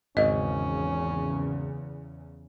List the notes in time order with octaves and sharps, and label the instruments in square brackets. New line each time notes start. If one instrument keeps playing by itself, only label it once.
[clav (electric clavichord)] G#1 [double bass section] E2 C#3 [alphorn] C#4 [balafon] D#5